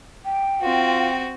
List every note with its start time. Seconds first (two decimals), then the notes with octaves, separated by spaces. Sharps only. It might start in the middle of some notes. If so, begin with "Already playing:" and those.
0.25 G5
0.62 C4 F4 F#4